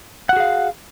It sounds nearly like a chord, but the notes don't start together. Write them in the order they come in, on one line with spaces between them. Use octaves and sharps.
F#5 F#4 G#4 F5